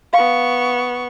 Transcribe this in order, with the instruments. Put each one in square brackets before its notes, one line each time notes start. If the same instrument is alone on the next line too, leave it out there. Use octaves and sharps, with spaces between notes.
[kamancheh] B3 C#6 [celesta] F5